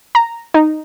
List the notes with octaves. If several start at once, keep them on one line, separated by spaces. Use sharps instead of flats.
A#5
D#4